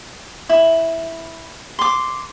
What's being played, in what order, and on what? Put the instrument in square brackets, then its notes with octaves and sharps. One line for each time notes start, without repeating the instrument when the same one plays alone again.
[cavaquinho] E4
C6 D6